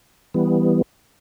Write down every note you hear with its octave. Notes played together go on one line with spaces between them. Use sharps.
E3 G3 B3